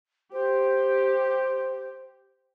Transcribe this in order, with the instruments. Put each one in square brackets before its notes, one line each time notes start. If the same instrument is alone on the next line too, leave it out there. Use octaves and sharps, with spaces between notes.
[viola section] G4 [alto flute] C5